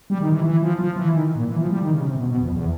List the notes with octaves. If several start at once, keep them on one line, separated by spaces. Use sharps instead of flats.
G3
D#3
E3
E3
F3
F3
E3
D#3
A#2
E3
F3
G3
D#3
C#3
C3
B2
B2
F2
E2